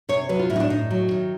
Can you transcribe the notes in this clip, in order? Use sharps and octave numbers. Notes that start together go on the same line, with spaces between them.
C3 C#5
F#3 B4
F4
A2 E4
D#4
D4
A2 D#4
F#3
D#3